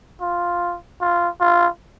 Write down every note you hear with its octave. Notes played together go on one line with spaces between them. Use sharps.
F4
F4
F4